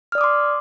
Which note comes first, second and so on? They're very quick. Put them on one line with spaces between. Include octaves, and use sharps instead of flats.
F6 D5 D#6 D6 C6